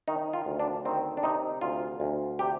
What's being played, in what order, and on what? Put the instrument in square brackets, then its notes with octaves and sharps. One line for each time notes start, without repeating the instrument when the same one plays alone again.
[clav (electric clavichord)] D#3 D#4
F4
D2
D4
D#3 C4
D4
C3 D#4
D2 F4
D2
C3 G4